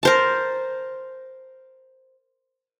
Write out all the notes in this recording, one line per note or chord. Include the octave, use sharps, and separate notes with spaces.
A#4 C5 A5